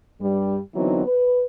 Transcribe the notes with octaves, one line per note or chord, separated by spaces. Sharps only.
G2 G3
D3 E3 F#3 B3 C4 D#4
B4